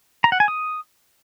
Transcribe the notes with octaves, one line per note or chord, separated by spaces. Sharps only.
A#5
F#5
G#5
D#6